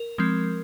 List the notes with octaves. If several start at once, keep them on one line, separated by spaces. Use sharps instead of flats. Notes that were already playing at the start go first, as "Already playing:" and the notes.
Already playing: A#4
F3 G#3 C4